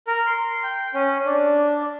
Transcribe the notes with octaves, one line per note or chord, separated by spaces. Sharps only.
A#4
C6
G5
C#4
D4